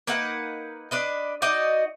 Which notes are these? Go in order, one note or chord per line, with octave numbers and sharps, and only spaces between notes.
A#3 D#4 B4 F#5
D4 B4 D#5
D#4 F#4 D5 D#5